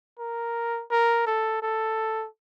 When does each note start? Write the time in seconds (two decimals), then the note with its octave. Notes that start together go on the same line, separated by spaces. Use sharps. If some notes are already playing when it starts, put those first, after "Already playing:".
0.19 A#4
0.91 A#4
1.27 A4
1.63 A4